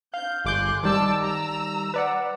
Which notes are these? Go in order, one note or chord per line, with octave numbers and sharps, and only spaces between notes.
F5 G6
G1 G#4 C6 D6 F#6 G6
D#3 G3 A5 D6 E6
A#5 E6
B4 D5 F#5